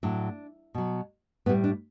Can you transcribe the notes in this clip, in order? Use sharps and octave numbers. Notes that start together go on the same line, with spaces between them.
A2 F#3 D4
B2 F#3
A2 G3 B3
D4